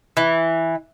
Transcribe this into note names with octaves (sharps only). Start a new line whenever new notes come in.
E3